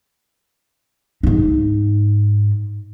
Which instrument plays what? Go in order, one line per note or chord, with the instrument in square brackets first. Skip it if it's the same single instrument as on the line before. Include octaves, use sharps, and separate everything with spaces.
[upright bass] G#2 D#4